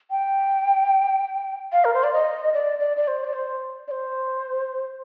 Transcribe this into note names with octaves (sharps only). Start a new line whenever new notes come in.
G5
F5
A#4
C5
D5
D#5
D5
D5
D5
C5
D5
C5
D5
C5